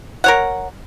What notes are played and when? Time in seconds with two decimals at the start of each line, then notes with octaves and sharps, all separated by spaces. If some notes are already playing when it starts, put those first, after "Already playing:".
0.24 A#4 C#5 F#5